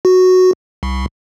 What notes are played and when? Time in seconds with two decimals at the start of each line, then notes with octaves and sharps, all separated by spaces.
0.05 F#4
0.83 C2